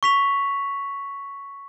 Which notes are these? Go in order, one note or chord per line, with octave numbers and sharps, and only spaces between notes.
C#6 B6 F7